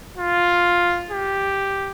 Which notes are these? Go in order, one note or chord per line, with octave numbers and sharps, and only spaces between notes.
F4
G4